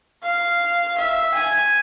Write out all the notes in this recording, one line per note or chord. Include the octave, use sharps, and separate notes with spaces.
F5
E5
G#5